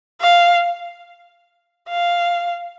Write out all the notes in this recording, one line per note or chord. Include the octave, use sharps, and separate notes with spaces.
F5
F5